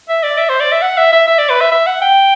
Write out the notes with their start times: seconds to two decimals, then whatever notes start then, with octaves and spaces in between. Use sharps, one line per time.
0.09 E5
0.23 D5
0.38 E5
0.49 C5
0.60 D5
0.72 E5
0.82 F#5
0.97 E5
1.12 E5
1.27 E5
1.38 D5
1.49 B4
1.61 E5
1.72 E5
1.86 F#5
2.01 G5